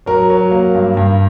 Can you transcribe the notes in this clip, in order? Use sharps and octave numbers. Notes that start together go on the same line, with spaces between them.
F#3 A#4
F#3
A#3
G2
G2